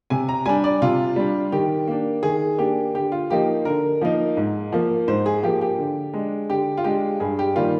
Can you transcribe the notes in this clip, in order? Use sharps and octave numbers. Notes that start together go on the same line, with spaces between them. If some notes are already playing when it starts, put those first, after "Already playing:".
C3 G#5
A#5
G3 D4 G#5
D5
C3 F4
G3 D4
D#3 G4
A#3 D4
D#3 G#4
A#3 D4 G4
D3 G4
F4
F3 A#3 D#4 G4
D3 A#4
F3 A#3 D#4
G#2
F3 A#3
G#2 C5
G#4
F3 A#3 G4
G4
D3
G#3 D4
D3 G4
F4
G#3 D4 G4
G2 G#4
G4
D#3 G3 A#3 F4